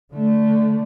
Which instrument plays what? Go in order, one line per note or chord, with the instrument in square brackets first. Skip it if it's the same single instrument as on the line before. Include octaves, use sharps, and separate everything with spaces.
[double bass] D3 A3